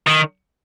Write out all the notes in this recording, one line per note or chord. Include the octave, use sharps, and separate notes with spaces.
D#3